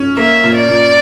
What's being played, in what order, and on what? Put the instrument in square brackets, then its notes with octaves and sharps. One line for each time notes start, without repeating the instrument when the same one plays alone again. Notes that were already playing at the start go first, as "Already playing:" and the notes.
Already playing: [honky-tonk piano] C#4
[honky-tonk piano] A#3 [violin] E5
[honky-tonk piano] A#2
[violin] D5
[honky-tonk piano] A#2